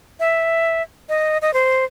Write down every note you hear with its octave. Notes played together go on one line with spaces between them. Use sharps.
E5
D#5
D#5
C5